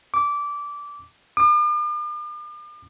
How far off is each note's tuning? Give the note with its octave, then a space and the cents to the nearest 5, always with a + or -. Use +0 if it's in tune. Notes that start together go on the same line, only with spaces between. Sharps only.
D6 -15
D6 +45